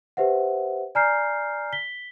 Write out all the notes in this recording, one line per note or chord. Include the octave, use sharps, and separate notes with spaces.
G4 B4 C5 E5 F#5
D5 G#5 A#5 F6 G6 C7
B6 G7